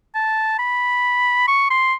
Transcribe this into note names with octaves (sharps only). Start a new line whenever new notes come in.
A5
B5
C#6
C6